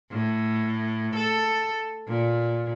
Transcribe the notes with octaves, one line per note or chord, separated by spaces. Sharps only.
A2
A4
A#2